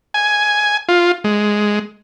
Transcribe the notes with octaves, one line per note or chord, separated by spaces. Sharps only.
G#5
F4
G#3